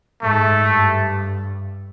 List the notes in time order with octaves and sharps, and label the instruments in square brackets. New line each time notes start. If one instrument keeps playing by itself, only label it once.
[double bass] G#2 [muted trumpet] A3
[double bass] G2